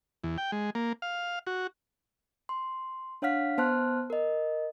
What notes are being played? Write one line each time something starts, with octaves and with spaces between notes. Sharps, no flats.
E2
G5
G#3
A#3
F5
F#4
C6
D4 C#5 F5 F#5 F6 B6
B3 C5 A5 C6 F6 F#6
A#4 D#5